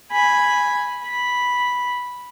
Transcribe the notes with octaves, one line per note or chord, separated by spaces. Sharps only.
G#5 B5
B5